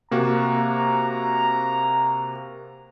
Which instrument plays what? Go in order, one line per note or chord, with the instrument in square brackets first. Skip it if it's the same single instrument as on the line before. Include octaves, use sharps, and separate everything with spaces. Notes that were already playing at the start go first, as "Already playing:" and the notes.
[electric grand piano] C3 A#3 F#4 [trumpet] A#5